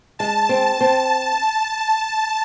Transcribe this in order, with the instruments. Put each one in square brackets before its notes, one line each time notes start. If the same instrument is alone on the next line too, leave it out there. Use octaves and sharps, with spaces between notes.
[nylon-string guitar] G#3 [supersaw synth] A5
[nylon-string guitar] C4
C4